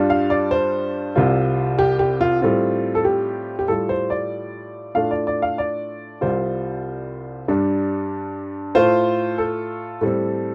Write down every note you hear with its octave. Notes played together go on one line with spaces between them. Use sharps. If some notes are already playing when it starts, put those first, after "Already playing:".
Already playing: G2 G3 D4 F4
F5
D5
C5
C2 C3 G3 F4
G4
G4
F4
A2 G3 C4 F4
A4
G4
G4
A2 G3 F4 A4
C5
D5
A2 A3 D4 F4 F5
D5
D5
F5
D5
C2 C3 G3 C4 F4 C5
G2 G3 D4
A2 A3 F4 C5
A4
A2 G3 C4